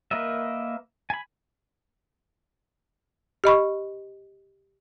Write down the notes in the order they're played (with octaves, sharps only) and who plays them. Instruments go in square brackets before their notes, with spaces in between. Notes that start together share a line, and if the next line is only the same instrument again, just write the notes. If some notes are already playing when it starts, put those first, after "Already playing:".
[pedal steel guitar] A#3 A#4 B4 D#5 E5
G#5 B5
[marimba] G4 D#5 B5 C#6